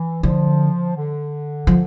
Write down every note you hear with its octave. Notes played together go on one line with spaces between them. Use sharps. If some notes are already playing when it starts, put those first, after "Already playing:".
Already playing: E3
D3 F3
D3
F3